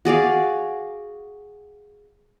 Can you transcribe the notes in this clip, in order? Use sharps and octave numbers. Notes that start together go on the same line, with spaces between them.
F#4 G#4 D5 F5